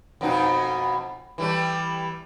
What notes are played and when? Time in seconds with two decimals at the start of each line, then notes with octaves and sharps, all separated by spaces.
0.21 F2 B2 D#4
1.38 E3 G3 A3